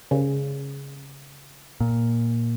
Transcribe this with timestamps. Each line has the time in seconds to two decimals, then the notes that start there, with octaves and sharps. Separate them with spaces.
0.11 C#3
1.80 A#2